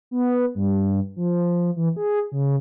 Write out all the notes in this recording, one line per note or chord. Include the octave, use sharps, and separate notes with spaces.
B3
G2
F3
E3
G#4
C#3